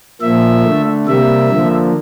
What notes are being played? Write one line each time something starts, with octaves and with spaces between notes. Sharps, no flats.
A#2 F3 A#3 E5
D3 A3
C3 G3 A#3 E5
D3 F3 A#3